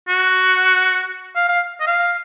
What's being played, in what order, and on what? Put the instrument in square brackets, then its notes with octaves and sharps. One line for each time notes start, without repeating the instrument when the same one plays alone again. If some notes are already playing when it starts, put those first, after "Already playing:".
[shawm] F#4
F5
F5
D#5
F5